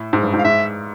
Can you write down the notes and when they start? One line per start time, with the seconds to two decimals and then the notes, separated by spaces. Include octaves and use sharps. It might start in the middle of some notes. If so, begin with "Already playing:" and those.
Already playing: A2
0.13 G#2
0.23 G2
0.34 G#2
0.39 F5
0.44 G#2 E5